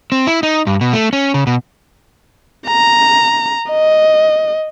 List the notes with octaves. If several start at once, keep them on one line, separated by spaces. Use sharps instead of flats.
C4
E4
D#4
G2
B2
A3
C#4
C#3
B2
A#5
D#5